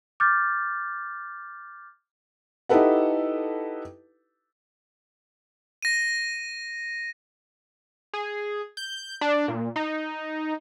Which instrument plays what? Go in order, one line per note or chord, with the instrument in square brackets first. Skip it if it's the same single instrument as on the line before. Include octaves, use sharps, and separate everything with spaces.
[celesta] D6 F6 G6 A6
[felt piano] D#4 E4 G4 A4 B4 F#5
[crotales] A#6 D#7
[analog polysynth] G#4
G6
D4
A#2
D#4